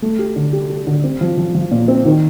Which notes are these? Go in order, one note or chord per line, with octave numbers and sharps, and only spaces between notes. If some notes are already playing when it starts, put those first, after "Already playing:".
A3
G4
D3
G4
G4
D3
C4
F3
F3
F3
A#2
C4
D#3